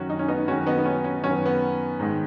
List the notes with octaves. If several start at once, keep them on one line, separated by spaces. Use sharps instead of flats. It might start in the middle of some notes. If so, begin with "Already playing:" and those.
Already playing: F#2 D#3 C#4 F#4
D#4
C#4
B3 D#4
F#2 D#3 C#4 F#4
B3 D#4
B3
C#4
C#4
F#2 D#3 C#4
B3
B3
G#2 D#3